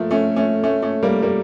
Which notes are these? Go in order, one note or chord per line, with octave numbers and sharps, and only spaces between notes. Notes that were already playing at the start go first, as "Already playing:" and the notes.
Already playing: F3 A3 A#3
A3 C#4
A3 C#4
A3 C#4
A3 C#4
G3 A#3
G3 A#3